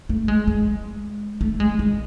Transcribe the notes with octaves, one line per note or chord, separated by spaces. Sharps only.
A3
G#3
G#3
A3
G#3
G#3